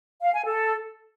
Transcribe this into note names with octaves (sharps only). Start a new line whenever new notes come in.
F5
G#5
A4